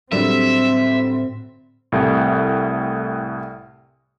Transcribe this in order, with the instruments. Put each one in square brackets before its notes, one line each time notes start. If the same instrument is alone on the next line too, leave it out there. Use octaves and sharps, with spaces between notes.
[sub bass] A2 [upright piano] D3 F#3 G3 [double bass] C4 [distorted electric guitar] E5
[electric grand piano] C2 A2